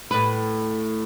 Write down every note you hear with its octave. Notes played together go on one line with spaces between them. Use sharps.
A2 B4